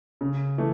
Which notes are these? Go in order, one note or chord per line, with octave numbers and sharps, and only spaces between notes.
C#3
E3 A3